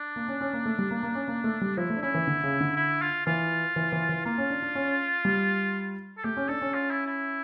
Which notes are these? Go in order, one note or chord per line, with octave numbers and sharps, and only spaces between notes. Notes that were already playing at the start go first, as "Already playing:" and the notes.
Already playing: D4
A#3
C#4
C#4
A#3
A3
G3
A#3
A#3
C#4
A#3
A3
G3
F3 E4
A3
D4
C#4 E4
E3
D3
C#3
D3
E4
F4
E3 F4
E3
E3
E3
A#3 F4
C#4
D4
D4
C#4
G3
A4
A3 G4
C#4
D4 A4
C#4
F4
E4
E4